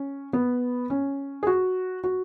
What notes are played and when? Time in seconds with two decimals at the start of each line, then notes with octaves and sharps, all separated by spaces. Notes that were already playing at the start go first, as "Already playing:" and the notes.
Already playing: C#4
0.33 B3
0.90 C#4
1.43 G#4
1.47 F#4
2.04 F#4